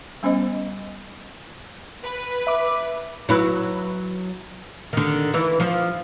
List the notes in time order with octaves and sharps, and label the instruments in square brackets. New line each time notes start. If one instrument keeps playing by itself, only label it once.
[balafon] G3 B3 C#4 C5 D#5
[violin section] B4
[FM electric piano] E5 D6
[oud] F#3 E4 B4
D3 D#3
E3 E4
F3